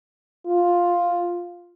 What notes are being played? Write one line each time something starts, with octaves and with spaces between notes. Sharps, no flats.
F4